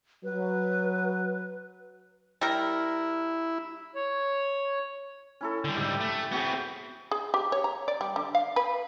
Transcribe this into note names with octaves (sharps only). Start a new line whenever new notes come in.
F#3 B4
G3 E4 A#4
C#5
C#4 E4 A4
D3 G3
G#2 G3 G4 E5
A3
B3 C4 F#4 G#4
G#4
G4
C#5
A#5
D5
G3
D3
F5
B4